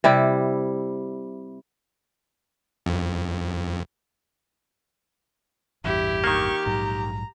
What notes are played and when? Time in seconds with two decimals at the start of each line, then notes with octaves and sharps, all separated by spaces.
0.04 C3 G3 E4
2.86 F2
5.84 A1 E2 G2 E4 G4
6.24 D#3 A#3 C#6
6.66 A#1 G#2 F#3 A#5